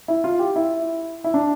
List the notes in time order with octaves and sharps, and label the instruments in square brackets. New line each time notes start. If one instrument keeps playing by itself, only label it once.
[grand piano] E4
F4
G4
E4
E4
D4